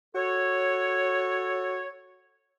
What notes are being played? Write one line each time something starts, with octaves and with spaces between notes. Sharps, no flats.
F#4 A4 C#5